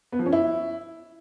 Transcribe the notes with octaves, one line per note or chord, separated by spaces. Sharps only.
B3
F3
C#4
E4